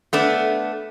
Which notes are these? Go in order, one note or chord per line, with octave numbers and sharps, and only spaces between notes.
A3 B3 D4